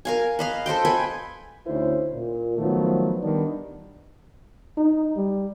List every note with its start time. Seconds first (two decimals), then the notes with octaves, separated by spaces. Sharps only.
0.05 A#4 F5 G#5
0.39 B4 D#5 F5
0.66 A4 C5 D#5 G5
0.85 B4 G5 G#5
1.67 D2 C#4 D#4 E4 C5
2.13 A#2
2.58 D#3 F3 F#3 A3 B3
3.21 D#3 G3 B3 D4
4.77 D#4
5.16 G3